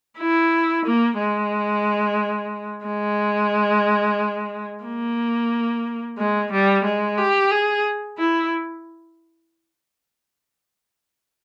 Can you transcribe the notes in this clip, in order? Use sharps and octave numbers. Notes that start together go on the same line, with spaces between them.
E4
A#3
G#3
G#3
A#3
G#3
G3
G#3
G4
G#4
E4